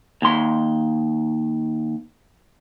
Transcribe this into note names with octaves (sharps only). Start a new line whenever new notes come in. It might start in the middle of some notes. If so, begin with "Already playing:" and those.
D#2 C6